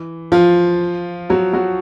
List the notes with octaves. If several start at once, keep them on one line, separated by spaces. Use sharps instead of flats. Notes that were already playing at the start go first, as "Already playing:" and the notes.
Already playing: E3
F3 F4
F#3 F#4
F#3 F#4